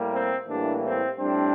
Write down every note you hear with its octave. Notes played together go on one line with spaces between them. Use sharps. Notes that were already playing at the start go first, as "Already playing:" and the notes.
Already playing: A2 G3 A#3
C4
A2 E3 G3 A#3 D4
C4
A2 G3 C4 D4